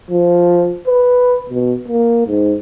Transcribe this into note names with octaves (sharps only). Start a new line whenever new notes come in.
F3
B4
B2
A#3
G#2